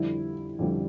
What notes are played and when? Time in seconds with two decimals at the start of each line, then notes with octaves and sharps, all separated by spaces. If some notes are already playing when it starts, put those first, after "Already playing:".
Already playing: F2 D3 G3 E4
0.59 F2 D3 G3